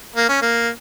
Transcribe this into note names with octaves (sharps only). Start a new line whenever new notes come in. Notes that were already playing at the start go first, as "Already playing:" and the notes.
A#3
C#4
A#3